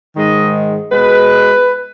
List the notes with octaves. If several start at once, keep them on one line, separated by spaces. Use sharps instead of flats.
G#2 D#3 G#3 D#5
B2 G#3 B4